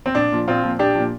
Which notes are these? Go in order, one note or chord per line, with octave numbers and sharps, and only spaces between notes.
C4
A#1 D4
A#2 F3
A#1 C4 F4
A#2 F3
A#1 D4 G4
A#2 F3